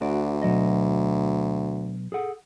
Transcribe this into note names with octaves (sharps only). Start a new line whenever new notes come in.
D2 F#4 D5
B2 F#3 D#5
G#4 A4 F#5